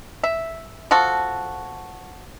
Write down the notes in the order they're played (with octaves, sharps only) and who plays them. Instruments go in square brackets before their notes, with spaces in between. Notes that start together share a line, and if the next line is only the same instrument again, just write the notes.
[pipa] E5
F3 F4 F#4 A4